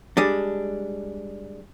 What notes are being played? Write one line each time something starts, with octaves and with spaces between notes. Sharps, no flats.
G3 G#3 D4